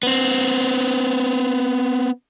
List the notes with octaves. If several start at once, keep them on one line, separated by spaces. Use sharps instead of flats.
B3 C4